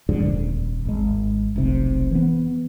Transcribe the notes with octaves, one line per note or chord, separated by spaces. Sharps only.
F2 G#2 D3
D#1
G#1 G#3
F1 B1 C3
E3 B3